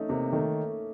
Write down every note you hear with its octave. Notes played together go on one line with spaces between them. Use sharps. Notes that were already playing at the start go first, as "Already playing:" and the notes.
Already playing: A3 C#4 D#4
C3 A#3
D#3 A3